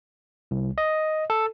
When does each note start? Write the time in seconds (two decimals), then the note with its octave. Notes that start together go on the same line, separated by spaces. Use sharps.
0.51 C2
0.78 D#5
1.30 A4